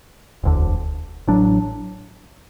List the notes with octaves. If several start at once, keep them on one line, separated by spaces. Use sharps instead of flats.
E1 D2 D3
A1 A2 F#3 D4